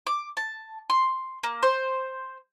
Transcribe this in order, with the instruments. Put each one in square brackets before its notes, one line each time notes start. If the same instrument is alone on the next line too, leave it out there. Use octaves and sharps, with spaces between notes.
[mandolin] D6
A5
C6
A#3
C5